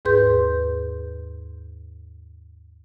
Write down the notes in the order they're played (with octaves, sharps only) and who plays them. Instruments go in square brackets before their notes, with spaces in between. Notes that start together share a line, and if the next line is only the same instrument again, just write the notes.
[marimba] D#2 G#2 G#4 B4 C6 G6